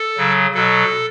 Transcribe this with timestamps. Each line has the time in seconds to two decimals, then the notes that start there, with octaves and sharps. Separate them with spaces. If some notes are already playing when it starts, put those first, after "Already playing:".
Already playing: A4
0.17 C#3 F#3
0.54 B2 F#3 A4